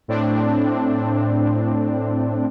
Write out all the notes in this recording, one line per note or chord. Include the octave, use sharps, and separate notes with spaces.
A2 C4 D4